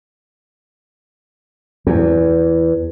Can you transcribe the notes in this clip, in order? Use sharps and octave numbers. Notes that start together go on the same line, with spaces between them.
E2